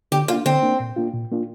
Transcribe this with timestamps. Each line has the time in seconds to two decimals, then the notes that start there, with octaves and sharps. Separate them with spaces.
0.12 D3 G4
0.28 A#3 D4 F4
0.46 D3 C4
0.63 A#3 D4
0.80 A#2
0.96 A#3 D4 F4
1.14 A#2
1.32 A#3 D4 F4